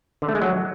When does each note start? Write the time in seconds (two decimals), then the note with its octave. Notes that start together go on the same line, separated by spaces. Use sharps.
0.22 D3
0.29 A3
0.35 G#3
0.42 F#3